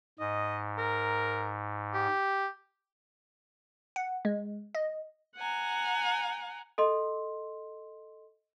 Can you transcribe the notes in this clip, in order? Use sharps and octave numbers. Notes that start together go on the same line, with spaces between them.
G#2 D#5
A#4
G4
F#5
G#3
D#5
F#5 G#5 A#5
A4 D#5 C6